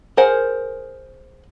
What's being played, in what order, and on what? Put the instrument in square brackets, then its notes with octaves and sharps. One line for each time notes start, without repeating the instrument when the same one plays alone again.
[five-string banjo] G#4 A#4 C5 F#5